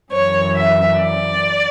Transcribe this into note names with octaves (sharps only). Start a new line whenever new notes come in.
F#2 E3 C#5
E5
D5